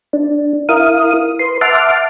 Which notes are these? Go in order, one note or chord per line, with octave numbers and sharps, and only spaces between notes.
D4
E4 A#4 F5 D#6
B4 C6
E5 F#5 A5 C6 D6 F6